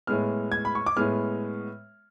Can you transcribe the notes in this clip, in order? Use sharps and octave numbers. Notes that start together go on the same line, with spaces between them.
A2 G#3 B3 F6
G#6
B5
C#6
D6
A2 G#3 B3 F6